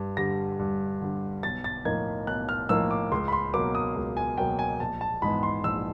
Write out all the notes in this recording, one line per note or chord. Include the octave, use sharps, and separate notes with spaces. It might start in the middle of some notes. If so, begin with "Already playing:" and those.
Already playing: G2
D3 G3 A#6
G2
D3 G3
B1 A6
A6
A2 F3 A#3 D#4 G#6
B1 F#6
F6
A2 F3 A#3 D#4 E6
D6
C#2 C6
B5
C6
B2 F#3 A#3 D6
D#6
C#2
G#5
B2 F#3 A#3 G5
G#5
A#1 A5
A5
G#2 E3 G#3 B3 B5
C6
A#1 E6